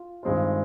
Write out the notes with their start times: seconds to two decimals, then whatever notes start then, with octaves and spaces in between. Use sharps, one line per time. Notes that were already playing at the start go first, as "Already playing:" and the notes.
Already playing: F4
0.23 G2 D#3 G#3 C4 F4